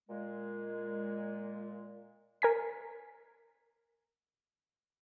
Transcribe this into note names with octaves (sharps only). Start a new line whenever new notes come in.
A#2 G#3
A#4 G#5 B6